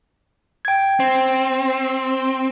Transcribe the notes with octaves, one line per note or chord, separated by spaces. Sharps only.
G5 G#6
C4